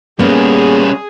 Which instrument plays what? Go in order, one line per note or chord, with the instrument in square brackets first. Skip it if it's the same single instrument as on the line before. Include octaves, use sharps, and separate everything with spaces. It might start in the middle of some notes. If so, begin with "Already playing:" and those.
[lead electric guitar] G3 C#4 [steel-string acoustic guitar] A#3 B3 [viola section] G#4